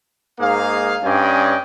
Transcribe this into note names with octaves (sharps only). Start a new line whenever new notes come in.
G#2 A#3 D#4 G#4 F5
G2 C#4 D5 D#5 G5 G#5